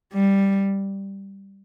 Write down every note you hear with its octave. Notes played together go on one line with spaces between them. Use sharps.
G3